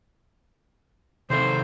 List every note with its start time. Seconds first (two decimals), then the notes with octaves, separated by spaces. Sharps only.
1.30 C3 D#3 A4 C5